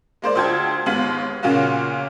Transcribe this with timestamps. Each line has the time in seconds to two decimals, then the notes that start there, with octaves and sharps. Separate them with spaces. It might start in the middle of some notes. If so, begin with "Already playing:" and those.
0.22 G#3 A#3 C5 D5
0.35 D2 F4 C5 G5 A5 G#6
0.86 D#2 G#2 B3 F5 F#7
1.43 A#2 C#3 A#3 C#4 F4 F#4